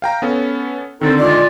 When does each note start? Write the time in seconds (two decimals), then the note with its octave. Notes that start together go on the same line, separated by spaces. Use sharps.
0.02 F5 G5 A#5
0.22 B3 C#4 A4
1.01 D3 D#3 C4 D#4 A4
1.19 G#3 F4 D5